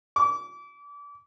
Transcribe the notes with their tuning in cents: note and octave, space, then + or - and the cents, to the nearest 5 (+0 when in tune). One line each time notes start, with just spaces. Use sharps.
D6 -30